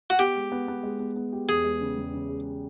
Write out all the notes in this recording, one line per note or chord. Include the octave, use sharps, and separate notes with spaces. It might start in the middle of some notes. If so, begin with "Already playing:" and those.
F#4
B3 G4
G#3
B3
B3
G#3
B3
B3
G4
E2 G#4
G#3
C#3
E2
C#3
G#3